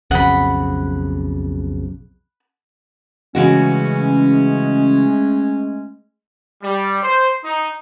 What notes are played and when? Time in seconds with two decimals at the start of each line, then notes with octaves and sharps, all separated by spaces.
0.11 B1 F2 C#3 F#5 B5
3.35 C#3 E3 G#3 A3 C#4 F#4
6.62 G3
7.03 C5
7.43 D#4